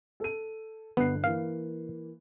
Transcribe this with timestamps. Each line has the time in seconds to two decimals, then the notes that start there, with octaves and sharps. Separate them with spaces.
0.20 A4 D#7
0.97 G1 B3 F#6 C7
1.24 E3 A#3 F5